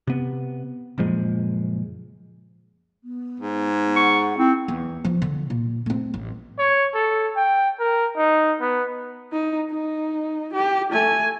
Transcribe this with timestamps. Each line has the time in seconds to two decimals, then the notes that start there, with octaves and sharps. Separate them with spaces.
0.07 C3 B3
0.98 F#1 A#2 F3 G#3
3.04 B3
3.40 G#2
3.96 F#5 C#6
4.37 C4 E4
4.68 E2
5.05 F3 F4
5.22 D3
5.50 A#2
5.86 A3 C4
6.14 A1
6.59 C#5
6.94 A4
7.37 G5
7.80 A#4
8.17 D#4
8.61 B3
9.32 D#4
9.71 D#4
10.53 G4
10.92 A3 G#5